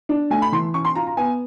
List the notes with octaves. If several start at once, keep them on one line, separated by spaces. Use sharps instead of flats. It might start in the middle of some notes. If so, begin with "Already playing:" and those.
D4
A3 G#5
B5
E3 C6
C#4 C#6
C6
F4 A#5
A#5
B3 G#5